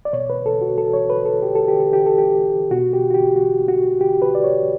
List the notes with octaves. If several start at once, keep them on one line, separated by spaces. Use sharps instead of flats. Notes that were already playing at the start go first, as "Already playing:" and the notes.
D5
B2 C#5
B4
A4
F#4
A4
C#5
B4
A4
G4
A4
G4
A4
G4
A4
G4
B2 F#4
G4
F#4
G4
F#4
F#4
G4
B4
D5
C#5